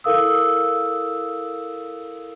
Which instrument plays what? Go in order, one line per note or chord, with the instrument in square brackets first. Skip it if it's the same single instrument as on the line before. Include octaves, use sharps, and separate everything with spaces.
[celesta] E4 A4 A#4 F5 D#6 E6